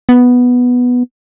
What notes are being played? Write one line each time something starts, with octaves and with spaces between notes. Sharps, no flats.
B3